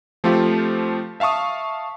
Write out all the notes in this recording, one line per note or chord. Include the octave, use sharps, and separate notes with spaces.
F3 A3 C4 F4 G4
E5 F5 A5 C#6 D#6